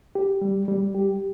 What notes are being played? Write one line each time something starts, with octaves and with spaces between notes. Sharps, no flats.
G4
G3
G3
G4